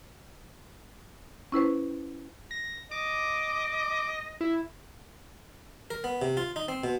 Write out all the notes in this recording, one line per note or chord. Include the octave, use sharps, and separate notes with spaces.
C#4 E4 B4 C5
A#6
D#5 D6
E4
A#4
B3
C3
F4
D#4
C4
B2